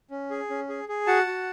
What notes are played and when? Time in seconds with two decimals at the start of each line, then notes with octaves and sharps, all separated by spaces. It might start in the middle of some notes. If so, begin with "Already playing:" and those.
0.11 C#4
0.30 G#4
0.50 C#4
0.69 G#4
0.89 G#4
1.07 F#4 F#5 A5
1.27 F#4